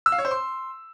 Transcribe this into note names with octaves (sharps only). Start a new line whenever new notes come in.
E6
F5
C#5
C5
C6